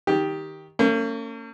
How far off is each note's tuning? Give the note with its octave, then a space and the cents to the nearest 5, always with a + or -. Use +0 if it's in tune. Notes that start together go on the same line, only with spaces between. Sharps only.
D#3 +10 G4 +0
A#3 -45 C#4 +0